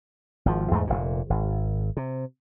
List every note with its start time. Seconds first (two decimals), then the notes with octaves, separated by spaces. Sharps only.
0.46 G#1 F3
0.71 E2 G#2 G3 A3
0.87 F1 A#2
1.30 G#1
1.97 C3